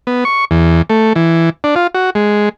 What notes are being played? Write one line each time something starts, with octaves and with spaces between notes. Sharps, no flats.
B3
C#6
E2
A3
E3
D4
F4
F#4
G#3